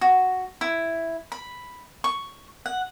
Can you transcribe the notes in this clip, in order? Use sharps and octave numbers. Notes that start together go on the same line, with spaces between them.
F#4
E4
B5
C#6
F#5